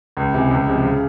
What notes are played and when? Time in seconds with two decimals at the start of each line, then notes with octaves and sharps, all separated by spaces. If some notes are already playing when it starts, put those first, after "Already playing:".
0.17 C#2
0.34 C3 E3
0.51 C#2
0.68 C3 F3 G#3
0.85 C#3